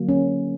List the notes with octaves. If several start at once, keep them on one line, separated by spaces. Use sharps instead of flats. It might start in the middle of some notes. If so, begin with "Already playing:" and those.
Already playing: D3 F#3 A#3
C#4